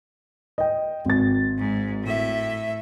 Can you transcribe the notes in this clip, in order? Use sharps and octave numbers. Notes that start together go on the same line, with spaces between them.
D#5 G5
G#1 A6
G#2
A2 E5